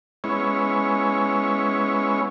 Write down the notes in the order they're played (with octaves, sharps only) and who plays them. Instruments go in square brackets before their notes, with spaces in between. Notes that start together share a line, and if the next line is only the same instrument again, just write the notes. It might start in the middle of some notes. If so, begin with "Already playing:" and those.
[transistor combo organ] G#3 B3 C#4 E4 C#5